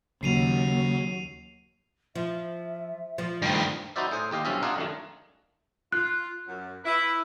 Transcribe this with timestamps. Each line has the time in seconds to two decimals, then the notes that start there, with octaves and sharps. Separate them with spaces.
0.23 D#2 C#3 F#3 C7 D#7 F7
2.15 F3 E5
3.18 F3
3.42 G2 D#3 A3
3.96 D#4 E4 F#4 C5 D5 E5
4.11 A2 G#4 C5
4.31 D#2 G4 D#5 F5
4.45 B1 G2 C4 C#4 F4 E5
4.63 D4 F4 G#4 A#4 F5 F#5
4.76 F#2 D#3 A3
5.92 F4 F#6
6.47 F#2
6.85 E4 B4